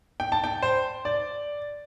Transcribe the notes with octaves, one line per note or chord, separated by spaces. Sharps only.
G5
A5
G5
C5
D5